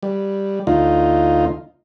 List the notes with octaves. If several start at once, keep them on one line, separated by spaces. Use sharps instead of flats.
G3
D2 D#4 F4